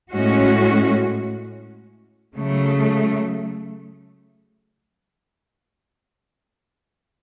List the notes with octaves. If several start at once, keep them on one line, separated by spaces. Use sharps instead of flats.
A2 G#3 C#4 F#4
C#3 F#3 A3